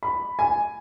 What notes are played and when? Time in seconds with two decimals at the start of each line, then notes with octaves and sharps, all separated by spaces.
0.03 B5
0.39 G#5